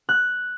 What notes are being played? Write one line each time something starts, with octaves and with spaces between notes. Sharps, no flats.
F#6